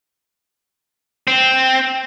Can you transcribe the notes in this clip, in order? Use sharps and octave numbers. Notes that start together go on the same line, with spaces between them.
C4